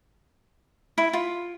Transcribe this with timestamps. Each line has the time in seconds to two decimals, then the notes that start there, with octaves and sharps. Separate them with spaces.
0.98 E4
1.13 F4